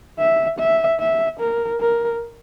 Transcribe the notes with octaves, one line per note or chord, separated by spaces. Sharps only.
E5
E5
E5
A#4
A#4